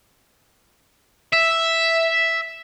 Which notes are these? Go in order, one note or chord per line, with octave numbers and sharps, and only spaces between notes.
E5